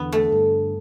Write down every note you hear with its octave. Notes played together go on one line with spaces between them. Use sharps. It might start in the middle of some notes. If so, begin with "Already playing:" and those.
Already playing: E2 D3 B3
A3
G2